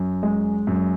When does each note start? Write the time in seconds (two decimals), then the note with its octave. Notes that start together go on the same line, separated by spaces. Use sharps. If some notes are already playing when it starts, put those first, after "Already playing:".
Already playing: F#2
0.23 G#3
0.67 F#2